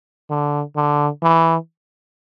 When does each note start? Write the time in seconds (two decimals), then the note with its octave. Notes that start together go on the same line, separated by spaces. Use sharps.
0.30 D3
0.76 D3
1.23 E3